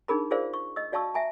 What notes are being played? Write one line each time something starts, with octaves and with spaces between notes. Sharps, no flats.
D4 D#4 G#4 A#4 B5
F4 G#4 A#4 C5 D5 F5
C#6
D#5 E6
F#4 D5 F5 A5 C#6 E6
E5 G#5 A#5